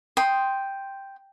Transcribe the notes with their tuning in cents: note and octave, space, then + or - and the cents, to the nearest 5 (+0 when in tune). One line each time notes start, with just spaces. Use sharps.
G5 +0 C6 +0 D#6 +5